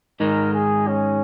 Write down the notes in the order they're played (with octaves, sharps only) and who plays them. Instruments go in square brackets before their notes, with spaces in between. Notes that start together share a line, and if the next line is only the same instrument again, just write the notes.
[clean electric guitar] G#2 D#3 G#3 D#4 [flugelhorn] A#4
[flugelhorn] G#4
C#4